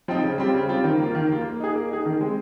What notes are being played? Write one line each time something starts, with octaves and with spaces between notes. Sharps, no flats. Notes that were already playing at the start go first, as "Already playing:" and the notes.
F3 C4 D#4
C#3
G3 C4 F4
C#3
G3 C4 F4
D#3
A#3 F4
D#3
A#3 F4
A#3
D#4 G#4
A#3
D#4 G#4
D#3
G#3 C4